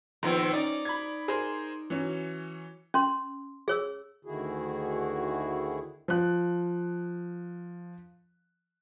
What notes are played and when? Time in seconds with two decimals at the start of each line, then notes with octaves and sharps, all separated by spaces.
0.23 A#1 D#3 B3 C4
0.53 C#4 D#4 D5
0.85 B5 G#6
1.28 G#4 A#4 C5
1.90 E3 F#3 C#4
2.94 C#4 C6
3.68 G#4 C#5 E6
4.25 D2 D3 D#3 E4 F#4 G#4
6.08 F3 F#6